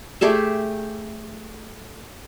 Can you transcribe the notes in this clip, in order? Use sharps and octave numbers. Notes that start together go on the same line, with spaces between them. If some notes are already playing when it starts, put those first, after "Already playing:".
A3 G4 G#4 E5